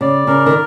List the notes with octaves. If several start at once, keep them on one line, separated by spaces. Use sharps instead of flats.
C#3 D5
C#3 A#4
D#3